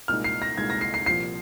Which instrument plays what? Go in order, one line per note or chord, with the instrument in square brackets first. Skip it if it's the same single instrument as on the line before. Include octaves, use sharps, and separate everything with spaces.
[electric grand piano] C2 A#2 G#3 D#4 [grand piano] F6
[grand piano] C7
A#6
[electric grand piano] C2 A#2 G#3 D#4 [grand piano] G#6
[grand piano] A#6
C7
C7
[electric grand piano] C2 A#2 F3 [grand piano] C7